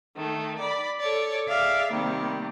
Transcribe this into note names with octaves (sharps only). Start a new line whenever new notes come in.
D#3 A3
D5 B5
A4 C#5 D5
G#4 D5 E5 F5
C3 D#3 G3 A#3